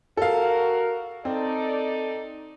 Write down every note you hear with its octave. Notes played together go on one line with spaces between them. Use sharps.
F#4 A4 A#4 F5
C4 D#4 A4 D5